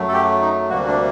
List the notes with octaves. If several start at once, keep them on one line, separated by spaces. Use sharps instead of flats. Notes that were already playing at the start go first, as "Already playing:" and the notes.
Already playing: F#2 F#3 A3
A4
G4
D#4
D2 C3 G3 A#3 F#4
D4